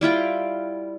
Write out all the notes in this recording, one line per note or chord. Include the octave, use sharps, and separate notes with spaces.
G3 E4 F4 G5